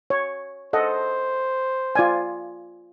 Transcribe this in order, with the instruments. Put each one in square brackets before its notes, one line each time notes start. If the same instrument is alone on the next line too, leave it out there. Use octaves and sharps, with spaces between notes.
[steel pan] C#5
[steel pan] A4 D#5 F#5 [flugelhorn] C5
[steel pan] F4 D5 G#5